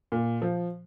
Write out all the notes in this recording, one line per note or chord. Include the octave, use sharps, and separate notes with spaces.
A#2
F3